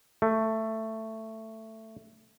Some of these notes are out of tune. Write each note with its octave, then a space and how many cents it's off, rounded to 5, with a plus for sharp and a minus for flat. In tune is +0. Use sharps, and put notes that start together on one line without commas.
A3 +10